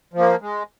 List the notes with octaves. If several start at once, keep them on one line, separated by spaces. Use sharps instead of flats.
F3
A#3
G#3